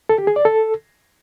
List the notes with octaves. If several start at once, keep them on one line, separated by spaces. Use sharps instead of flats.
A4
G4
G#4
D5
A4